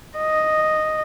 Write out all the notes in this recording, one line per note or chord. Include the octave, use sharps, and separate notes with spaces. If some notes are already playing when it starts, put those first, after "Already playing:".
D#5